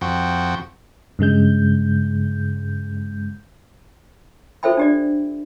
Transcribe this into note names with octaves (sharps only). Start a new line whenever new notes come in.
F2 F#4 G5
G2 C#3 G#3 G6
F4 A4 C5 E5 G5 B5
D4 G4 D5